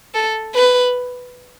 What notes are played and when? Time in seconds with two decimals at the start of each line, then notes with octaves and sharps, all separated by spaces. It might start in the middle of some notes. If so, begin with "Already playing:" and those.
0.14 A4
0.55 B4